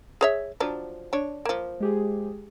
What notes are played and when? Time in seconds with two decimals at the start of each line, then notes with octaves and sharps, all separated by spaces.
0.21 G#4 C#5 E5
0.60 F3 F#3 D4
1.13 D4 C#5
1.45 F3 A#3
1.80 G#3 G4 G#4